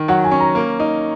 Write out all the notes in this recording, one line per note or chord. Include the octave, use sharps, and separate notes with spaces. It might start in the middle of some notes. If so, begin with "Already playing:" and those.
Already playing: D#3
F#3 F#5
G#5
C#4
A#5
A#3
D#4